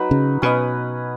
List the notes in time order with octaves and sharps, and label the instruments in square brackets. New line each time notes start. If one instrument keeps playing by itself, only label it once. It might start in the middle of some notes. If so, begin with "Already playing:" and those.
Already playing: [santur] F#3 D#4 B4
[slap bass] C#3
[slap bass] B2 [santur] C#4 B4 D#5